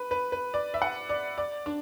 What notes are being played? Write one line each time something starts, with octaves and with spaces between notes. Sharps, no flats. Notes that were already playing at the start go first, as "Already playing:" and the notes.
Already playing: B4
B4
B4
D5
E5
F#5
D5
D5
D4